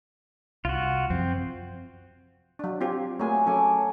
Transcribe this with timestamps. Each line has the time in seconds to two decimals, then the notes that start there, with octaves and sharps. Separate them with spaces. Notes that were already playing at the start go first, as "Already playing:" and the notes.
0.65 C2 F4 F#4
1.10 F#2 F3 C4
2.59 F#3 D4
2.81 C4 F4 G4
3.19 F#3 A3 A#3 G#4 G#5
3.46 F#3 C#4 A4 G#5 D6